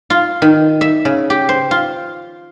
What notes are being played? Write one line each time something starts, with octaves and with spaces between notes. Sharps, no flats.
F4
D#3
E5
C#3
G4
C5
F4